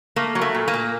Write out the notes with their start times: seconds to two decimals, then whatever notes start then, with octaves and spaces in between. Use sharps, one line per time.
0.16 A3 A#3
0.35 F#3
0.42 A3
0.55 A#2
0.68 A#3
0.74 A#2